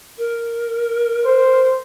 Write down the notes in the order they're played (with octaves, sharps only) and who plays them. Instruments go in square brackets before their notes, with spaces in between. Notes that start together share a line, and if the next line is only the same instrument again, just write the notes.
[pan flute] A#4
[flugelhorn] C5